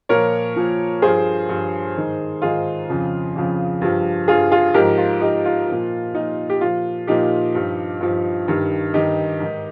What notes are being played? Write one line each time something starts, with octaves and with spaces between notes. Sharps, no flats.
A#2 F3 A#4 C#5
A#2 F3
G2 F3 G#4 C5
G2 F3
G#2 D#3
G#2 D#3 F4 G#4
F2 C#3 F3
F2 C#3 F3
G2 F3
G2 F3 F4 G#4
F4 G#4
G#2 F3 G4 A#4
F4
G#2 F3 D#4 G4
F4
A#2 F3
A#2 F3 D#4
G4
A#2 F3 F4
A#2 F3 D#4 G4
G2 F3
G2 F3
G2 D#3
G2 D#3 D#4 G4
G#2 D#3